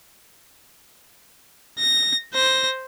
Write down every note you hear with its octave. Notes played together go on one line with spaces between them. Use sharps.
A#6
C5 A#6